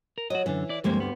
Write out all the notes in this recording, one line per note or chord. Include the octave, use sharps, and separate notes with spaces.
A#4
F#3 F#4 D#5
F#2 D3 E3
E4 D5
D2 G2 F3 G#3 A#3 C4
B3